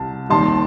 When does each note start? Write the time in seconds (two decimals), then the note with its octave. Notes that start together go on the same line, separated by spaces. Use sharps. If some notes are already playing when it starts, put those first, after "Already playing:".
Already playing: C2 C3 A5
0.29 D#2 D#3 G3 A5 C6